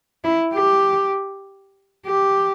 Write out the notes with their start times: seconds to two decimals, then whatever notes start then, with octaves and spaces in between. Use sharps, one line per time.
0.24 E4
0.54 G4
2.06 G4